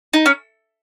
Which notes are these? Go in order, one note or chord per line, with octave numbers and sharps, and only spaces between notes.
D#4
C#4